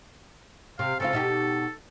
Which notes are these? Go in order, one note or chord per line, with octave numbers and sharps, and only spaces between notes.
C3 F5
C#3 C4 F4 A4
B2 D#4 G4